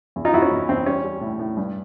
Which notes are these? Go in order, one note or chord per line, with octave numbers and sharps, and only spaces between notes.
E2
D#4 F4
E2 E4 F#4
C#4
E2
E2 C4
G3 C#4
G3
A2
A2
G2